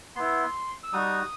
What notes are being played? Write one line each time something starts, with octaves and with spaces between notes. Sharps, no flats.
B3 E4 C6
E6
G3 D#4 F#4 D#6